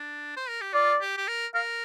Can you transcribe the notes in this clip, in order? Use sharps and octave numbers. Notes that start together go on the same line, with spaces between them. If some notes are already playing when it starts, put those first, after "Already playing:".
Already playing: D4
C5
A#4
G4
F4 D5
G4
G4
A#4
A#4 F5